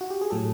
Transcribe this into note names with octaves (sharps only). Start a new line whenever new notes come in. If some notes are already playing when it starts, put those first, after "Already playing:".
F#4
G4
G#4
A2 F#3 A4